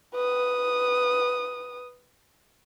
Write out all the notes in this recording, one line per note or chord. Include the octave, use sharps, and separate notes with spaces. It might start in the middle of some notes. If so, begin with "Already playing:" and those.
B4 D#6